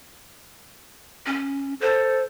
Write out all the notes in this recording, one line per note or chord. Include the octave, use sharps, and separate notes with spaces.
C#4
A4 C5